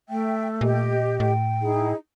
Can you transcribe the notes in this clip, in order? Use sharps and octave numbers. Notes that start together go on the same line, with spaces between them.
A3 E5 G5
A#2 G4 D#5
A2 G5
D#4 E4 G#4